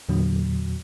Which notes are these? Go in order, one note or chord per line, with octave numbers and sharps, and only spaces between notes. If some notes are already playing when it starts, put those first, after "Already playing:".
E2 A#2 D3 F#3